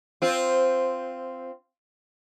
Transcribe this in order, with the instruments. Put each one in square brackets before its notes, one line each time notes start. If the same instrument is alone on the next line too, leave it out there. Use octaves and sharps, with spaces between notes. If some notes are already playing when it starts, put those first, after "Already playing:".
[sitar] C4 F4